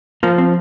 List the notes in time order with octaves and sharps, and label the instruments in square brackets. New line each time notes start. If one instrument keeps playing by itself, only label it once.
[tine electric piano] F3 [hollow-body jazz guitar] A#3
[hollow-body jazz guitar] C4